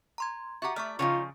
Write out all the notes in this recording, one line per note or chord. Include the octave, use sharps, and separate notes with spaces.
A#5 C6 G#6
F#4 G4 E5 F#5 A#5
A3 D5 E5 C#6 F6
C#3 F3 D#4 F4 F#4 C#5